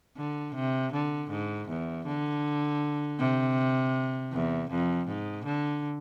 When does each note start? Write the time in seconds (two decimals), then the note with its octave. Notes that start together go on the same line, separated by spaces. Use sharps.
0.17 D3
0.55 C3
0.93 D3
1.30 G#2
1.68 E2
2.06 D3
3.19 C3
4.32 E2
4.70 F2
5.08 G#2
5.45 D3